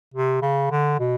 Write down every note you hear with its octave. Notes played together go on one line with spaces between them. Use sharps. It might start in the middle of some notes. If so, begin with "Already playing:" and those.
C3
C#3
D3
B2